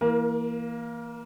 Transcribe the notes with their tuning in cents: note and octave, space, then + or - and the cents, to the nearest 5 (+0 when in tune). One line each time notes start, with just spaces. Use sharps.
E3 +0 A#3 +0 A#4 +35